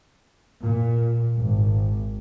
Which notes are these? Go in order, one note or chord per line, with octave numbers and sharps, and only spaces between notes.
A#2
G#1